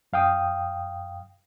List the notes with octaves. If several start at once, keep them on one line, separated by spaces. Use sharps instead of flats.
F#2 F5 G5 D#6